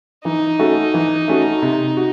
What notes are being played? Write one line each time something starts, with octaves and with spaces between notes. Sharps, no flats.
E3 D#4
A3 C#4 F#4 A4
E3
A3 C#4 F#4 A4
C3
F#4